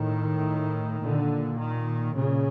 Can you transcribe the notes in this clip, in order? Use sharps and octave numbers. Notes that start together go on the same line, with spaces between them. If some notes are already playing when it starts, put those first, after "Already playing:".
Already playing: A2 D#3
A#2 D3
D#3
A#2 C#3